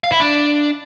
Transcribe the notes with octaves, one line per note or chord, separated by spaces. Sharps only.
F5
E4
D4